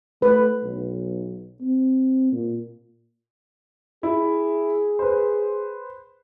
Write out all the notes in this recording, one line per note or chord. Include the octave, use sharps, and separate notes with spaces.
A3 B4
B1
C4
A#2
E4 G#4
B4 C5